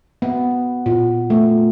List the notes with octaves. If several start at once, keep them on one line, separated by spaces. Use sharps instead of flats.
B3
A#2
A3